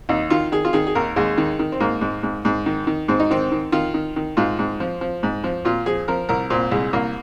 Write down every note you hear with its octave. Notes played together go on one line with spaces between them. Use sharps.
D#2 D#4
D#3 F4
D#3 G#4
F4
D#3 G#4
G#4
D#2 A#4
D#2 G#3
D#3
D#3
C4
G#2 A#3
G#2
G#2
G#2
D#3
D#3
G#2 C4
D#4
D#3 C4
D#3
D#3 F4
D#3
D#3
G#2 F4
G#2
F3
F3
G#2
F3
A#2 F4
F3 G#4
F3 A#4
C2 A#4
A#2 C4
C2 G#3
C2 A#3